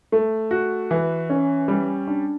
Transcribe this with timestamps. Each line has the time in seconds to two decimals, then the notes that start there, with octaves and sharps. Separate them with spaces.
0.12 A3
0.51 F#4
0.91 E3
1.30 C#4
1.68 G3
2.07 D4